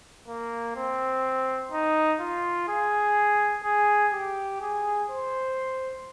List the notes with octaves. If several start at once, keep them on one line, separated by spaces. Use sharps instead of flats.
A#3
C4
D#4
F4
G#4
G#4
G4
G#4
C5